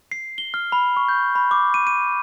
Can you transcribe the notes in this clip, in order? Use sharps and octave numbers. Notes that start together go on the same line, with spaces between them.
C7
G7
F6
B5
C#6
G6
B5
D6
D#7
D#7